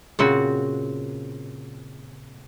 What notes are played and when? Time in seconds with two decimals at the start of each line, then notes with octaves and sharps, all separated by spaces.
0.19 A#2 C#3 C4 F#4